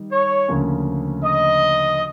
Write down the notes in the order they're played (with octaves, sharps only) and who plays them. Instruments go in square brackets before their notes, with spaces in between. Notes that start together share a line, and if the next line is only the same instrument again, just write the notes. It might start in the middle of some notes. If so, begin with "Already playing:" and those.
Already playing: [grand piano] D#3 G3 D#4
[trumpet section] C#5
[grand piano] D2 C#3 F3 A#3 C#4
[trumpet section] D#5